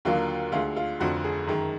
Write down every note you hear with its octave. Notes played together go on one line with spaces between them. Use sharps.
D#2 D3 F#3 A#3 F4
D2 D3 G#3 F4
F4
F1 F2 D3 F#4
G#4
F#2 D#3 G#3